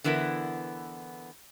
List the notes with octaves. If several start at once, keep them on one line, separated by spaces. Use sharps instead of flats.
D3 E3 B3 E4 A#4